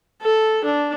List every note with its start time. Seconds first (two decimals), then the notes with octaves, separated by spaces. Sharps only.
0.22 A4
0.64 D4